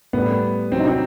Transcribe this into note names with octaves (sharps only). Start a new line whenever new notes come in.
A2 G3 B3
C3 F#3 C4
D#4
C4